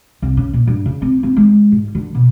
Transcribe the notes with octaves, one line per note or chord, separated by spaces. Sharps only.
C2
C#3
A#2
G2
C#3
C4
C4
G#3
G#2
D3
B2